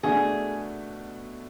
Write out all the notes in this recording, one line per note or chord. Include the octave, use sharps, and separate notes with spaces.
B2 A3 D4 F#4 G#4